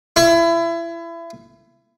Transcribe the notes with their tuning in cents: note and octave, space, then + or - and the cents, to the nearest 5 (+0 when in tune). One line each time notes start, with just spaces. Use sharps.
E4 +30